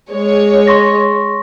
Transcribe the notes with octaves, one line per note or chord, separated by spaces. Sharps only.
G#3 C#5
C6 C#6 A#6